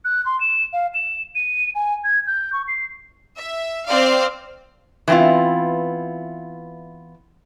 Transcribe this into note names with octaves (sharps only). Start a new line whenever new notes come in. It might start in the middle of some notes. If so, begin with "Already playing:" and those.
F#6
C6
E7
F5
E7
D#7
G#5
G#6
G6
C#6
C7
E5
C4 C5 D5 F5
E3 B3 C4 E4 F4